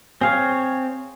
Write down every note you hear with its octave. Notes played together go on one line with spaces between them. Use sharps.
C4 G#4 C#5 F5